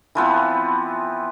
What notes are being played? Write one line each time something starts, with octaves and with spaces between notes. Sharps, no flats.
E3 F3 B3 C4